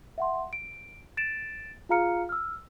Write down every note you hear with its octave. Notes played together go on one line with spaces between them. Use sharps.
E5 F#5 C6
D7
A6 D7 E7
F4 G#4 F5 A#5 F6 C#7
E6 F6